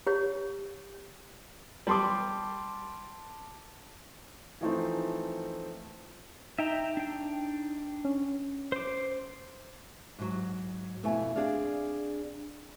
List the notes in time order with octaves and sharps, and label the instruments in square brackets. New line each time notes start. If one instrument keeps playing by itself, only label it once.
[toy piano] G4 C#5
[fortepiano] G3 [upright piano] A5 C6 D6
[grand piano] E3 F3 A3 C4 D#4
[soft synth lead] D#4 [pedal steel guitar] E5 G5 A#5
[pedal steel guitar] D4 G5
[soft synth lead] C#4
[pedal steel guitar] C5 D6
[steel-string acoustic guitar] G#2 F#3
F2 B2 A3 B3 E4 G#5
C4 D4 G#4 D5 F5